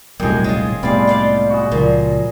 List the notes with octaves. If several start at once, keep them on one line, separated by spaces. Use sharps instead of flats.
D#1 C2 F#2 A2 G#3 G4 G#4
G#3 F4
C2 A2 G3 G#3 B3 D5 F5
F4 D5 F5
F#4 G#4
C#2 A#2 F3